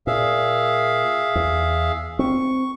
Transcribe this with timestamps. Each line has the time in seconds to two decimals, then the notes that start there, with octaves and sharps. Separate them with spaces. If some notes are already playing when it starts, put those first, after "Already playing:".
0.07 A#2 G#4 E5 F5
1.35 E2
2.19 C4 C#6